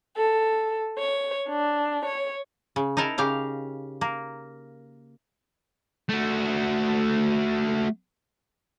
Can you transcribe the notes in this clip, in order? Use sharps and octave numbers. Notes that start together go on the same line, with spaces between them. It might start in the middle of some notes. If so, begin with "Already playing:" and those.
A4
C#5
D4
C#5
C#3
D#4 E4 A#4 A5
C#3 G4 F5 A#5
A#3
A3 F#4